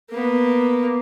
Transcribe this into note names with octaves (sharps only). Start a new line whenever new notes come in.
A#3 B3